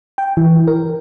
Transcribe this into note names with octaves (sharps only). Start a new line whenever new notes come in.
G5
E3
A#4